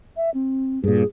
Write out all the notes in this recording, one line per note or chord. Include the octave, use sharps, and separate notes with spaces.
E5
C4
G2 A#2 G#4